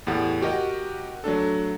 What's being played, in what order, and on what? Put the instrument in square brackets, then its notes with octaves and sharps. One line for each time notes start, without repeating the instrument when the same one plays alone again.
[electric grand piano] E2 A2 G4 F#5 A6
F#4 G4 A#4 D#5 F#5
F#3 A3 D4 A4